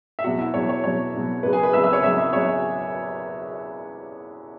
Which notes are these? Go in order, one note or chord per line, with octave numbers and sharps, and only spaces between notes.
E5
E2 B2 F#3 F#4 F#5
E4 E5
E2 B2 F#3 C#5
C#5
E2 B2 F#3 C#5
E2 B2 F#3
E2 C#3 F#3 B4
G#4 G#5
B4 B5
E2 C#3 F#3 E5 E6
E5 E6
C#5 C#6
E2 C#3 F#3 E5 E6
E5 E6
E2 C#3 F#3 C#5 C#6